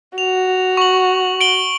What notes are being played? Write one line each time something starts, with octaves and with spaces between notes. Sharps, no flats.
F#4 F7
C#6 F#7
D7 F#7 G7